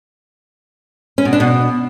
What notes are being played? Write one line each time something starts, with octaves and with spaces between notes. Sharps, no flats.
C#4
B2
D4
B2